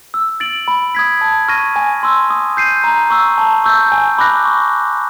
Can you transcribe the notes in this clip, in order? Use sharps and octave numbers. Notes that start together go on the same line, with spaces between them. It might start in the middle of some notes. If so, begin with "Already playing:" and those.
E6
A6 D7 F#7
B5
D#6 G#6 B6
A5
C#6 F6 A#6 D#7
G#5
C6 E6
D#6
G6 C7 D#7
A#5
C#6 E6
A5
C#6 E6 G6
G#5
B5 D6 F#6 A#6
C#6